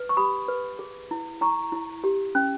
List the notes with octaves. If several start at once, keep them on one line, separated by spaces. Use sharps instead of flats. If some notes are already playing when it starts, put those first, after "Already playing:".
Already playing: B4
C#6
G4 B5 D#6
B4
G#4
E4
E4 A#5 C#6
E4
G4
C#4